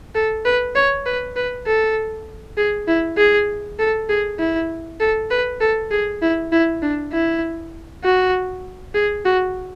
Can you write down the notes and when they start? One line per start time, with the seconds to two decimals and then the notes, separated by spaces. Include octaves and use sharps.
0.15 A4
0.45 B4
0.75 C#5
1.06 B4
1.36 B4
1.67 A4
2.57 G#4
2.88 E4
3.18 G#4
3.79 A4
4.09 G#4
4.39 E4
5.00 A4
5.31 B4
5.61 A4
5.91 G#4
6.22 E4
6.52 E4
6.82 D4
7.13 E4
8.04 F#4
8.95 G#4
9.25 F#4